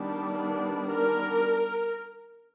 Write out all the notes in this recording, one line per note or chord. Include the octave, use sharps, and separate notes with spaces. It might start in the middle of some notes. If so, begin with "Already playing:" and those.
Already playing: D#3 G3 B3 D4
A#4